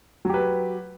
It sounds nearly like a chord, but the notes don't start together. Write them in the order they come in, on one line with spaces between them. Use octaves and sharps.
F#3 G4 B4